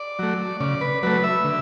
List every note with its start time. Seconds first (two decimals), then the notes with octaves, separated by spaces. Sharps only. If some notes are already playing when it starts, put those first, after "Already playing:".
Already playing: D5
0.19 F#3 A3
0.60 C#3 D5
0.81 B4
1.03 F#3 A3 B4
1.24 E5
1.44 D3